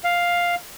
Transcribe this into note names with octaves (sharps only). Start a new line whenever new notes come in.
F5